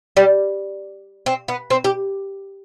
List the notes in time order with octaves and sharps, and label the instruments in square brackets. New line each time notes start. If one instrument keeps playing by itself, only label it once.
[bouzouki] G3
C4
B3
C4
G4